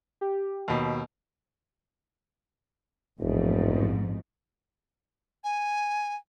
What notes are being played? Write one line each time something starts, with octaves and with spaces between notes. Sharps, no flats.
G4
D#2 B2
E1 A1 F2 G#2
G#5